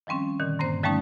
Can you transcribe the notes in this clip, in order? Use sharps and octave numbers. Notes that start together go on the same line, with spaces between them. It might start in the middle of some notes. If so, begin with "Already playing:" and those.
D#3 F3 G3 C4 C#4
A#2 D3 D#3
G2 A#3 C4 C5
D3 F3 G3 A3 C#4 D#4